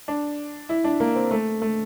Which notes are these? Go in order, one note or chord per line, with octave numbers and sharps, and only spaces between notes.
D4
E4
D4
A#3
C4
A3
A3